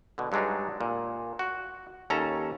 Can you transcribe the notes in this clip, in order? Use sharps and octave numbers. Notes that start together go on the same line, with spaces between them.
B2 D3
G2 F#3 G#3 D4 D#4
A#2
F#4
D#2 C#4 A4 A5 A#5